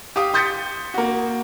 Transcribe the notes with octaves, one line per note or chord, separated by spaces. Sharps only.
G4 F5 D#6
C6 D#6 G6 A6 B6 C#7
A#3 F#4